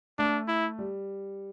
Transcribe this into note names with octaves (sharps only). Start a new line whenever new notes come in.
A3 D4
E4
G3